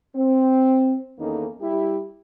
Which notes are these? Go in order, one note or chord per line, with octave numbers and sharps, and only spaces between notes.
C4
E2 D#3 A#3 C#4 D#4 A4
G3 E4 G4